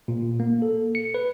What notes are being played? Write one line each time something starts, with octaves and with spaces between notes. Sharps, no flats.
A#2
A#3
A4
C#7
B4